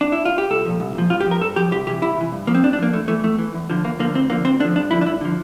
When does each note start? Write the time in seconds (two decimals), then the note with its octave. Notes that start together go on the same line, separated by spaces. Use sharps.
0.01 D4
0.12 E4
0.25 F4
0.38 G4
0.50 C2 A4
0.65 A#2 F3
0.80 C2
0.95 A#2 F3
1.10 G2 F4
1.21 G4
1.26 F3
1.31 A#4
1.41 G2 A4
1.56 F3 G4
1.71 C2 G4
1.87 C3 E3 G4
2.02 C2 E4
2.17 C3 E3
2.32 G2
2.47 F3 A#3
2.55 C4
2.63 G2 D4
2.73 D4
2.78 F3 A#3
2.93 E2 A3
3.08 E3 A3
3.24 E2 A3
3.39 E3
3.54 E2
3.70 D3 F3
3.84 E2 A#3
3.99 D3 F3 A#3
4.14 D2 C4
4.30 D3 F3 A#3
4.45 D2 C4
4.60 D3 D4
4.64 F3
4.75 G2 D4
4.91 D3 F3 E4
5.01 D4
5.06 G2 E4
5.21 D3 F3